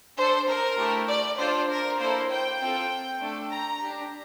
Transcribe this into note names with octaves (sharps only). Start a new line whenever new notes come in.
D4 A4 C5
A#4
A3 E4 G4
D5
D4 F4 A4 C5
A#4
A#3 E4 A4 C5
G5
C4 F4 A4
A3 D4 A4
A#5
D4 G4